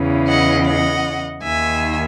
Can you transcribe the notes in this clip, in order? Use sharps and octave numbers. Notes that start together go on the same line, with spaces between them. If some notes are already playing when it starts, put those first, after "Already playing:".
Already playing: E2 C#3 E3
D#5 F#5
D#5 F#5
D#2 D#3 E5 G#5